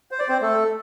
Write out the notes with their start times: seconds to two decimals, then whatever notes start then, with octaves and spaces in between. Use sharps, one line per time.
0.11 C5
0.19 D5
0.28 C4 C5
0.41 A3 A4